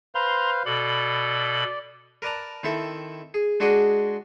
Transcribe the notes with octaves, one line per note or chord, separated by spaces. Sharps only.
B4 C5 F5 A#5 C6
B2 A4 D5 B5
A#4 B4 D5 A5 A#5
D#3 C4 E4 A4 E5
G#4
G#3 D4 F#4 G#4 D5 D#5